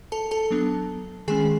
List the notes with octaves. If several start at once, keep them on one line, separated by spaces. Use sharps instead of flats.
A4 A5
A4 A5
F#3 B3 D4
D#3 G#3 C#4 G#4 G#5